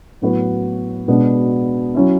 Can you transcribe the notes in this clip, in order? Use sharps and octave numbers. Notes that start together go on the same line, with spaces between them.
A2 F#3 B3 F#4 B4
B2 G#3 B3 D4
F#3 C#4 E4